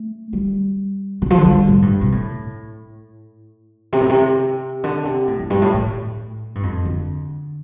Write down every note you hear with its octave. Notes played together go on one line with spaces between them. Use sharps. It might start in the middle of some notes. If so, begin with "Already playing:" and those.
Already playing: A3
G3
D3
F3
D3
G3
A2
G2
C3
A2
C3
A2
C3
D3
C3
A2
F2
G2
A2
A2
G2
F2
D3